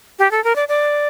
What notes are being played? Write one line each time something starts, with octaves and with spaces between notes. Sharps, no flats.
G4
A4
A#4
D5
D5